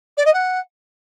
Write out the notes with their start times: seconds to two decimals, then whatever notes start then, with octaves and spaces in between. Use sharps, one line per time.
0.17 D5
0.25 D#5
0.33 F#5